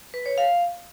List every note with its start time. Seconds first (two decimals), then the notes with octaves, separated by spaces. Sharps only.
0.14 B4
0.26 C#5
0.38 F5